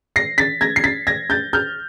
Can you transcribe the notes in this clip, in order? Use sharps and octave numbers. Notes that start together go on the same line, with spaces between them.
A#6 C7
A6 B6
G#6 A#6
C7
A6 B6
G#6 A#6
G6 A6
F6 G6